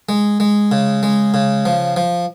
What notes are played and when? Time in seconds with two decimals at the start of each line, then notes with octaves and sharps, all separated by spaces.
0.09 G#3
0.40 G#3
0.71 C#3
1.03 G#3
1.34 C#3
1.65 F3
1.96 F3